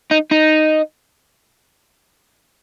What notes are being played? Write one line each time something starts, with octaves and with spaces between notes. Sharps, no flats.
D#4
D#4